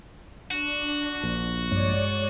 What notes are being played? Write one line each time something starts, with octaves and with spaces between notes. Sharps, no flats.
D4 F#4
A#1
G2 G#3 C#5 D5